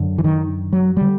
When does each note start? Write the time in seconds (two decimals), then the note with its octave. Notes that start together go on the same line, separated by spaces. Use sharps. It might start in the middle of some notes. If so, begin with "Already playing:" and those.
Already playing: F#2 D3
0.18 E3
0.24 D#3
0.73 F#3
0.97 D3 G3